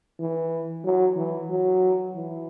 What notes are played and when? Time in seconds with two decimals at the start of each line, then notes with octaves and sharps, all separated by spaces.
0.19 E3
0.84 F#3
1.17 E3
1.50 F#3
2.15 E3